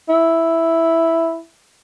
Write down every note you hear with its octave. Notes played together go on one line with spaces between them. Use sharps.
E4